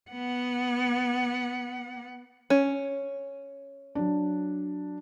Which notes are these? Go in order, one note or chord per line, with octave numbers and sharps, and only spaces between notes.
B3 F#5
C#4
F#3 D4